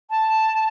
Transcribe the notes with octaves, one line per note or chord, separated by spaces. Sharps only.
A5